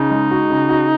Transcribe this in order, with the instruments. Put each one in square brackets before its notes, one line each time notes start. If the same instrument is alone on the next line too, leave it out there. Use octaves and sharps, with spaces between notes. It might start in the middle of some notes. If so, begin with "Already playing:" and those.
Already playing: [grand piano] C#3 [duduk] D#4
[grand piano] G#3
F#4
C#3
F#4